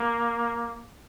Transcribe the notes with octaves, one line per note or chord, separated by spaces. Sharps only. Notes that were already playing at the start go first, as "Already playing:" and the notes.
Already playing: A#3